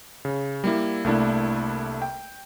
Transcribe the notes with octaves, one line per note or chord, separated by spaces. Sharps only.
C#3
G3 A#3 E4
C2 A3 A#3 D4 E4
G5